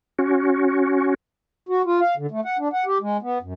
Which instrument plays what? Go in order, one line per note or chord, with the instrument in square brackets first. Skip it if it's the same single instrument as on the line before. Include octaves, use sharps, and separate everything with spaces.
[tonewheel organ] C#4 F#4
[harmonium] F#4
F4
F5
D3
A3
F#5
D4
F#5
G4
G#3
B3
F#2